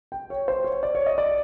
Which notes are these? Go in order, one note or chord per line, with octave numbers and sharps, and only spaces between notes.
G5
C#5
C5
C#5
D5
C#5
D#5
D5